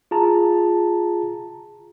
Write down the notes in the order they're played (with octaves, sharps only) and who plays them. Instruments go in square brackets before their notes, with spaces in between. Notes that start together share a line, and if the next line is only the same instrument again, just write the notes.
[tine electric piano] F4 G#4 A5 A#5